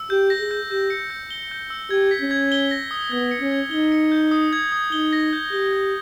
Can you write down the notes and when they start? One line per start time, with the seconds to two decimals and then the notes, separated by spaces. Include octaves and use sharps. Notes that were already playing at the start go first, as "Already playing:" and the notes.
Already playing: E6
0.10 G4 G6
0.30 A#6
0.40 G#4
0.51 G6
0.70 G4 G6
0.90 C#7
1.10 G6
1.31 G7
1.51 G6
1.70 E6
1.91 G4 G#6
2.11 B6
2.21 C#4
2.31 G#6
2.52 G7
2.71 A#6
2.91 D#6
3.12 B3 G#6
3.31 C#7
3.41 C#4
3.51 G#6
3.71 D#4 G7
3.92 C#7
4.12 G6
4.31 D#6
4.53 G#6
4.72 D#6
4.92 D#4 G7
5.13 A#6
5.33 G6
5.52 G4 G7
5.73 G#6